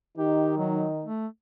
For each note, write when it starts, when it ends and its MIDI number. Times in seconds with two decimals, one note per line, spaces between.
0.18 1.06 51
0.18 1.06 63
0.18 0.53 67
0.57 0.86 54
1.04 1.27 57